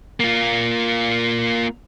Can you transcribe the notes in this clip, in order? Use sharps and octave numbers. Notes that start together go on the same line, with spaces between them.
A#3 F4